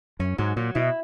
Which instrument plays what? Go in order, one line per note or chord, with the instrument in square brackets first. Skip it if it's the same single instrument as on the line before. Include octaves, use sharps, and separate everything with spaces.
[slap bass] F#2 [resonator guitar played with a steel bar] C#4
[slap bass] G#2 [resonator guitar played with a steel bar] F#3
[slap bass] A#2 [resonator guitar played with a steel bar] F#3
[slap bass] B2 [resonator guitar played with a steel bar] E4